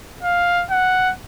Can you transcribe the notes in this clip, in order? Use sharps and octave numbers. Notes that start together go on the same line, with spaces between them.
F5
F#5